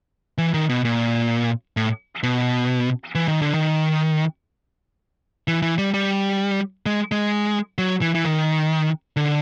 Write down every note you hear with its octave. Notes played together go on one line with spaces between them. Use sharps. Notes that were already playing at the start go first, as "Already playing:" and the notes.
E3
D#3
B2
A#2
A2
B2
E3
D#3
D3
D#3
E3
E3
G3
G3
G#3
G#3
F#3
E3
E3
D#3
D3